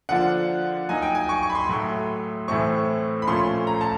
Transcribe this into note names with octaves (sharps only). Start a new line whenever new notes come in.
D3 F3 A#3 D4 F4 F#5
F#3 A#3 D#4 G#5
G5
G#5
C#6
C#6
B5
C6
A2 F#3 A3
A2 E3 A3 C4 C#6
B5
A#2 F3 A3 C#4 C6
A#5
A5